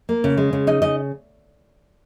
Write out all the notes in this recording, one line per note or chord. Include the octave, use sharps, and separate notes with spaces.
A#3
C#3
G#3
C#3
D#4 D#5
C#3 D#5